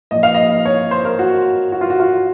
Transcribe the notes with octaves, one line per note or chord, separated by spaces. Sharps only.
A#2 F3 D#5
F5
D#5
C#5
C5
A#4
F#4
F#4
F4
F#4
F4